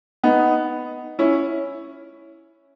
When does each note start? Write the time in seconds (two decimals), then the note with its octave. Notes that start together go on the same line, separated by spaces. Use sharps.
0.24 B3 D#4
1.19 C#4 E4